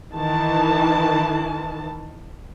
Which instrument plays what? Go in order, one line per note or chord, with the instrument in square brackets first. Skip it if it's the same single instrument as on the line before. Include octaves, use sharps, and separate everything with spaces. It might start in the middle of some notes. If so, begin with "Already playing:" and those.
[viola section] D#3 E3 A5